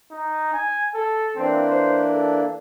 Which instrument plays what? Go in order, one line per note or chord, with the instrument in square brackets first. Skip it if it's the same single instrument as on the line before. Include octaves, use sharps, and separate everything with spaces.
[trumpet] D#4
G#5
A4
[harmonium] E3 A#3 D4 [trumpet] C4
[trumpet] C5
A4